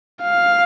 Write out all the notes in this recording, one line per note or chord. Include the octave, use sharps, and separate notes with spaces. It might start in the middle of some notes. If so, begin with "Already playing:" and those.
F5